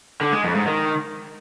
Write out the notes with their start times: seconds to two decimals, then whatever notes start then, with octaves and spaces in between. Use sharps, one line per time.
0.21 D3
0.32 G#3
0.44 F2
0.55 G#2
0.67 D#3